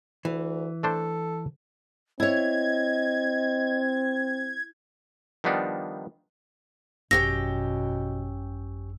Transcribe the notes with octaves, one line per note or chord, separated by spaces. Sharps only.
D2 E3
A3 D4 A4 C5
C4 E4 C#5 D#5 G#6
D#3 F3 G3 B3 D4 D#4
G#1 F#2 B2 C#4 G4 G5 E6 A#6